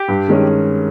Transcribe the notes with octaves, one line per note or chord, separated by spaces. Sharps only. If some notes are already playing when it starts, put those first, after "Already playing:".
Already playing: G4
G2
D#3 G#3 C#4